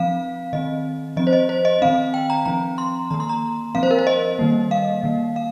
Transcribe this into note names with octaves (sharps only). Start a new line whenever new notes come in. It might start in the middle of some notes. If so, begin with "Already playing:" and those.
Already playing: F3 C4 F5
D#3 C4 D#5
F3 C4 D#5
C5
D#5
C5
D#5
D#3 C4 F5
G5
A#5
F3 C4 A#5
C6
D#3 A#3 A#5
C6
A#5
F3 C4 F5
C5
A#4
C5
D#5
D#3 G3 A#3
F5
D#3 A#3
F5